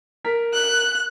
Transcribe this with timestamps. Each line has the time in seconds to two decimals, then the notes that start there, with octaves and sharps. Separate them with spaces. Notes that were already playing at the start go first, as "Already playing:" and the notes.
0.24 A#4 B6
0.53 F#6